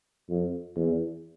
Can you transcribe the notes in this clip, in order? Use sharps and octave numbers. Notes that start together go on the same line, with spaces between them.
F2
E2